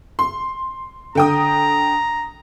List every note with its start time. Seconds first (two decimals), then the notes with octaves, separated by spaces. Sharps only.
0.19 C6
1.15 D3 G5 A#5 D#6